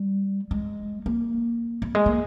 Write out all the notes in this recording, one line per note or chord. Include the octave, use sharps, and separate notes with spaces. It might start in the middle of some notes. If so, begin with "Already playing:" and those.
Already playing: G3
G#3
A#3
G3
G#3
A#3